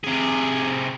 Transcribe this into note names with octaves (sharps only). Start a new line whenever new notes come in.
C3 G#4